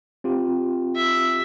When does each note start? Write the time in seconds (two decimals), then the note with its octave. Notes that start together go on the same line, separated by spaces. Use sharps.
0.24 C4 F4 G4
0.96 E5